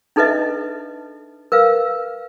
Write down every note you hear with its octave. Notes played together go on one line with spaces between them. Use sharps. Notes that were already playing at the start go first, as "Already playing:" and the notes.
D4 D#4 A4 B4 D#5 E5
A#4 B4 F5